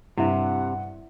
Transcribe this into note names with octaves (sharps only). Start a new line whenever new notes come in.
G2 C3 E4 E5 F#5